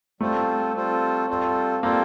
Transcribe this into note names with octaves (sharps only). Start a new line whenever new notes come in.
G3 A3 C4 F4 A4 C5
G3 C4 F4 A4 C5
G3 C4 F4 A4 C5
G3 A#3 C4 F4 A4 C5